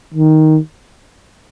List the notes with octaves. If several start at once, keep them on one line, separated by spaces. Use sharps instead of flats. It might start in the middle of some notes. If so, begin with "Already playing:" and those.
D#3